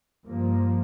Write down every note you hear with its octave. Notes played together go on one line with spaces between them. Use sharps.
G2 F3 A#3